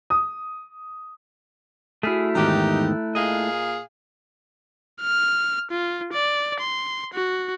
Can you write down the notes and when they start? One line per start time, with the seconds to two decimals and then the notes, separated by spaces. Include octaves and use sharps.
0.10 D#6
2.03 A3 E4 F#4 G#4 F6 B6
2.35 E2 G#2 D#3 D#4 G4 A#5 F#6
3.15 A#2 G#4 D#5 F5
5.02 F6
5.71 F4
6.13 D5
6.60 C6
7.14 F#4